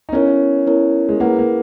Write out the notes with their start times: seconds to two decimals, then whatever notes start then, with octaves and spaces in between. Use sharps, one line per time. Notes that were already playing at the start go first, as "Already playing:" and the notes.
0.09 D#4
0.12 B3 C#4 E4 A#4 C#5
0.67 B3 E4 A#4 C#5
1.09 G#3
1.20 A#3 E4 G#4 B4 F#5
1.39 A#3